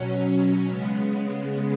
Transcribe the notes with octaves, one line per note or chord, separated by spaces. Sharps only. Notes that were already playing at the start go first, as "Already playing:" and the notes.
Already playing: B2 F#3 C#4
C#3 G#3 B3